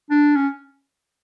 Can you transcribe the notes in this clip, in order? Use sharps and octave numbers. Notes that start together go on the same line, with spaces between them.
D4
C#4